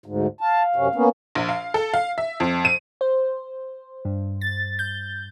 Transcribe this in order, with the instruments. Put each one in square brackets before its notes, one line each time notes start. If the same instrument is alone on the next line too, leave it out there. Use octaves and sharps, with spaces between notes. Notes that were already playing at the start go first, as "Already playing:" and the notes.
[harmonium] D2 G#2
[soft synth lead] F5 [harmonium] A5
[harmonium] F#2 C3 C#4
A#3 B3 C#4
[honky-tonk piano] A#1
F5
A4
F5
E5
F2
D#7
[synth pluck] C5
G2
A6
G6